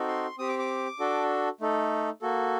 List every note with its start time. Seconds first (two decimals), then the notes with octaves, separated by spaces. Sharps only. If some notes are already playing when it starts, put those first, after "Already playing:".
Already playing: C4 D#4 F#4 A4
0.08 C6
0.38 C4 G4 D#6
0.49 D6
0.59 D6
1.00 D4 F#4 A4
1.61 A3 D#4 A4
2.22 A#3 F#4 A4